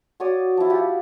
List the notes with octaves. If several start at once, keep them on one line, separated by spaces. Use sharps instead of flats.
F#4 C#5 D5 D#6
F3 E4
F4 G4 F#5 B5